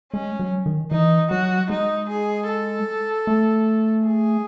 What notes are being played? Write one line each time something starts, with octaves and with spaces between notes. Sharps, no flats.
G#3 C#4
F#3
D#3
E3 D#4
F#3 F#4
G#3 D#4
G#4
A4
A3
G#4